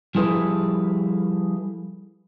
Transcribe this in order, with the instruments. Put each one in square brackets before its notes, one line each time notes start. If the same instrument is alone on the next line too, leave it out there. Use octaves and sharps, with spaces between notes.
[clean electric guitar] F3 G3 E4 G#4 A4 B4